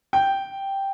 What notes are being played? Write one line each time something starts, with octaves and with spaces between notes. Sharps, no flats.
G5